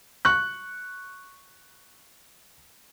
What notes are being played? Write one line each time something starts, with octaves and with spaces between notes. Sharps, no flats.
C#6 F#6